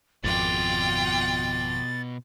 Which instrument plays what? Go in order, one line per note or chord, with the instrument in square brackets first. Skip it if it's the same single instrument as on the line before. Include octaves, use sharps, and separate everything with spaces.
[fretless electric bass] G#1 F2 [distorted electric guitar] B2 D5 [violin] F4 G5 [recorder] A6